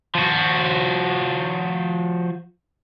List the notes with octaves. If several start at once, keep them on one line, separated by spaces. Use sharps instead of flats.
F3 F#4